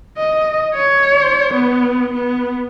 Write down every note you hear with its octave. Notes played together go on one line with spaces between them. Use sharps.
D#5
C#5
B3
B3